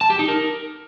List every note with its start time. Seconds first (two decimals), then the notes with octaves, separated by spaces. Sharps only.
0.01 A5
0.10 G4
0.19 D#4
0.28 A#4